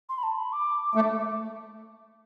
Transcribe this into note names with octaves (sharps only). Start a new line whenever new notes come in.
C6
B5
A5
B5
D6
A3 D6